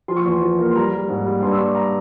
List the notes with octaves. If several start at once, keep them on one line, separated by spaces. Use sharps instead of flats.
F3 C6
C#6
E2 C6
F3
A#3
C6
G3 A#5
G3
G#2
G3
G2 C6
E6
G2 C#6
A#5